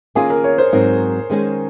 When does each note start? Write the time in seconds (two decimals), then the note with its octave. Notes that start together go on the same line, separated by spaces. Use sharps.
0.15 D#3 A#3 C#4 F4 G#4
0.30 A#4
0.44 C#5
0.58 C5
0.72 G#2 F#3 C4 D#4 A#4
1.30 D#3 G#3 C#4 G#4